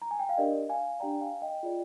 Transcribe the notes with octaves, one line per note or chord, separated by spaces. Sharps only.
A#5
G#5
G5
F5
D4 G4 A#4 D5 D#5
F5 G#5
D4 G4 D5 G5 A#5
F5 G#5
D#5 G5
F4 G#4 D5